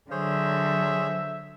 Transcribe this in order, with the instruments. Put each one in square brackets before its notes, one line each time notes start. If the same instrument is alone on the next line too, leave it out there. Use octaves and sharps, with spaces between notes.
[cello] D3 F#3 [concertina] G#4 C5 C#5 [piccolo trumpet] E5